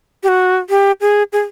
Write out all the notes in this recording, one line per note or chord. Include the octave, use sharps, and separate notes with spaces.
G4
F#4
G4
G#4
G#4